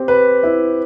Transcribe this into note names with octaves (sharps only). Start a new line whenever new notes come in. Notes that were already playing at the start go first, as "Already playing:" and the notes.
Already playing: C4 G4
B4
E4